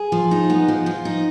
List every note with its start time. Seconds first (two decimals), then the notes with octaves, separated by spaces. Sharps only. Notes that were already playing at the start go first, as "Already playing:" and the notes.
Already playing: G#4
0.12 F3
0.31 D#4
0.50 B3
0.68 F3
0.86 F3
1.05 D#4